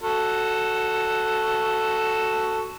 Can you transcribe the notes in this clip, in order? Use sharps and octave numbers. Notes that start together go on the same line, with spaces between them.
F#4 A4